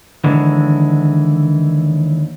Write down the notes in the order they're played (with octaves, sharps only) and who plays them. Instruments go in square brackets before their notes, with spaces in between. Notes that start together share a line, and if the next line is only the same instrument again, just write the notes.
[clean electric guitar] D#2 D3 E3 G#3